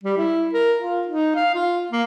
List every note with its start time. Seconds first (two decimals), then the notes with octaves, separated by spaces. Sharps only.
0.03 G3
0.18 E4
0.53 A#4
0.80 F4
1.07 D#4
1.35 F5
1.54 F4
1.91 A#3